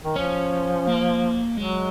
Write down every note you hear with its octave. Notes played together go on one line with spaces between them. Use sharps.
D#3
F3 C#4
A#3
F#3 G#3